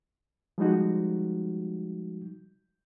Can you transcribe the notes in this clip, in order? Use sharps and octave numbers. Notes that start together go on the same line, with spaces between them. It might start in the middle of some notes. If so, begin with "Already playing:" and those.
F3 G3 G#3 D#4 F#4